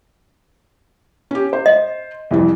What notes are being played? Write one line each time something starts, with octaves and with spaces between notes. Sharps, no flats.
C#4 G4
C5
D#5
C2 F2 E3